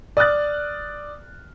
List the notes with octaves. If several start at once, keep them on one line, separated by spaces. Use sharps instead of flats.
D5 D#6 F6 F#6 A6